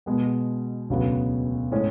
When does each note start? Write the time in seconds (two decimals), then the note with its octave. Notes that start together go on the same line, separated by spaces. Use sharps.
0.06 B2 G#3 B3
0.89 E1 D2 C#3 F#3 B3
1.72 A2 G#3 C#4